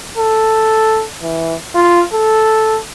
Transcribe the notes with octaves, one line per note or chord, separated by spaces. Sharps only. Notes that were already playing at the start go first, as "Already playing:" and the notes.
A4
E3
F4
A4